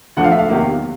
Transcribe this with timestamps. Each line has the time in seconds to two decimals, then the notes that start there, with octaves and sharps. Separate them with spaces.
0.17 D2 D3 F3 A3 F#5
0.24 F5
0.31 E5
0.39 F5
0.49 E2 C3 D#3 F#3 A#3